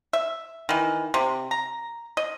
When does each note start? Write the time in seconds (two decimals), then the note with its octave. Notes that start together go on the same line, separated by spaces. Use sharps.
0.13 E5
0.69 D#3 E3
1.14 C3
1.51 A#5
2.17 D#5